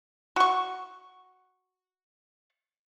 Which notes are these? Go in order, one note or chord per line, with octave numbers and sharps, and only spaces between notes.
F#4 C#6